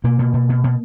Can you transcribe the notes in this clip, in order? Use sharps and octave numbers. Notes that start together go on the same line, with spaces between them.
B2 A#3
B2
B2
B2
B2